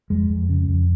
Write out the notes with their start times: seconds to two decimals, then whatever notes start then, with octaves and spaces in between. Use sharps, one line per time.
0.10 F2 G#3
0.30 F2
0.49 C#3
0.68 F2